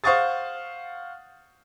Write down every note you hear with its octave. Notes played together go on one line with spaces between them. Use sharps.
C5 F5 F#5 C#6 D#6 A6